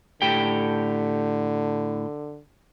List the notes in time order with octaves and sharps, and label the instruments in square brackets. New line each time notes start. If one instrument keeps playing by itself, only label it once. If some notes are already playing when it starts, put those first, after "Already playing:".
[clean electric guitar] A2 G4 G5 [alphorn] D3